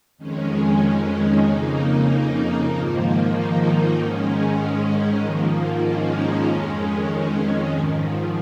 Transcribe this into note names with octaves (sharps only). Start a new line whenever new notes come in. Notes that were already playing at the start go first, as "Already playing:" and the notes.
F2 D#3 G#3 C#4
F2 C#3 A#3 D#4
G#2 D#3 F3 A#3
A#3 D#4
G#2 D#3 G#3 C#4
G#3
G#2 D#3 F3 A#3
G#3 C#4
F2 D#3 G#3 C#4
G#3
G#3
G#2 D#3 F3